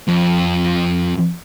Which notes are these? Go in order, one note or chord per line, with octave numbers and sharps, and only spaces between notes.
F2